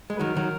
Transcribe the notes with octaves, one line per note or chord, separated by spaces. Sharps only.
G#3
B4
D#3 F#3 A#4
D#3 F#3